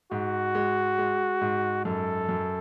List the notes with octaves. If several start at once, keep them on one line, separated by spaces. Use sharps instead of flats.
G#2 F#4
G#3
G#3
G#2
F#2 A4
F#2